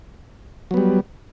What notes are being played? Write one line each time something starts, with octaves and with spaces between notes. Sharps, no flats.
F#3 G3 B3